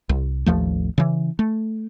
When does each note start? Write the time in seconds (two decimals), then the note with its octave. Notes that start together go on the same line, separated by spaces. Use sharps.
0.09 C2
0.46 A1 D#2 F3 A3
0.98 C#3 E3
1.39 A3